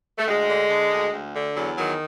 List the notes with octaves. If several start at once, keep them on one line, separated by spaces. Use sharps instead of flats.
A3
D2 G#3
D3
D3
D2
D2
D3
E2 F#3
D#3 F#3